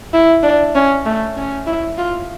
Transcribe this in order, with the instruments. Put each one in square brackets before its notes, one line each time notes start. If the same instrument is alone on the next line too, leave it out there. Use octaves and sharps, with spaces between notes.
[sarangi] E4
D4
C#4
A3
C#4
E4
F4